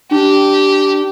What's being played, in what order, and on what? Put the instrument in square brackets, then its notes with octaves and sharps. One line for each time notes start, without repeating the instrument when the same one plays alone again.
[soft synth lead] D4 [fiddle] G4